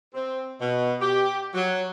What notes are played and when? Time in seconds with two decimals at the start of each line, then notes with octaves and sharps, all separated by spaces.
0.14 C4
0.60 B2
1.01 G4
1.54 F#3